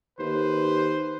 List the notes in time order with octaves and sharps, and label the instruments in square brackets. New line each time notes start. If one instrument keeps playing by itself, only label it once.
[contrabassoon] D#2 [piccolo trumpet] B4 [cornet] C5